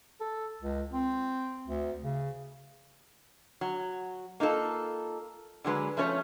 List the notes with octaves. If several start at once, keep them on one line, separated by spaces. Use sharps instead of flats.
A4
C#2
C4
D2
C#3
F#3
A#3 D#4 F4 A4
D3 F#3 G#3 B4
F3 A3 C#4 B4 C#5